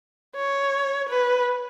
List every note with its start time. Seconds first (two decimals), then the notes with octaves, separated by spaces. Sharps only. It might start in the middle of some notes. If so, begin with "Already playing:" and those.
0.36 C#5
1.09 B4